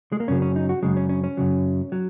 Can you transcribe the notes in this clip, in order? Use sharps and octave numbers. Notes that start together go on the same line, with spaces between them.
G#3
A#3
F#2 C#3 F#3 C#4
C#4
D#4
F#4
F#2 C#3 F#3 G#3
C#4
C#4
C#4
F#2 C#3 F#3
F#3